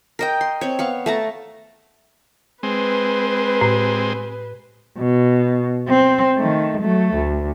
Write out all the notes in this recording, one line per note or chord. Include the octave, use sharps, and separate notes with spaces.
A#4 D#5 G5
C6
C4 C#5
B3 F5 C#6
A3 A5 A#5
G#3 C4 B4
A2
B2
C4
D#3 A3
F#3 A3
D2